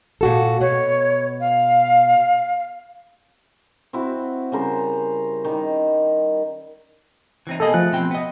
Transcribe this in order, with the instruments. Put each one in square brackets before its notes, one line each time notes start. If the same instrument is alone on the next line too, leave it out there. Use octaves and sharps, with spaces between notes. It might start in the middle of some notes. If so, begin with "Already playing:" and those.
[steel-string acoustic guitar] A#2 F#4 A4
[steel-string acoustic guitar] B2 [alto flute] C#5
[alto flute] F5
[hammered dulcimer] C4 E4 F#4
C#3 G3 A#4 C5
D#3 G3
[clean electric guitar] E3 C4 D#4
[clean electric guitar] B2 A#3 G#4 [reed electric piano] A4 D#5
[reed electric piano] F3 F#6 [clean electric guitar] A3
[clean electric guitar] B2 C4 G5
B3 D#5